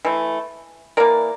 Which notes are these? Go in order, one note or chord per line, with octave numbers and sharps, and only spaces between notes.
E3 A3
E3 A#3 A#4 D5